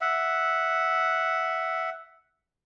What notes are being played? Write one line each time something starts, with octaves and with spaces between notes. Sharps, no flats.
E5 F#5